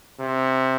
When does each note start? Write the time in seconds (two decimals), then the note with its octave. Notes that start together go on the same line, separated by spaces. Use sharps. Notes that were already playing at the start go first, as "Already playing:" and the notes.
0.19 C3